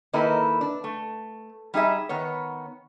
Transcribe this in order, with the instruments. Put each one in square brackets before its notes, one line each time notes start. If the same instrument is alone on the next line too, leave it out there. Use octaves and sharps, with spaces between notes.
[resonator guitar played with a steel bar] D#3 A#3 D#4 E4 A4 B4
D4
A3
G3 D#4 G#4 E5
D#3 B3 C#5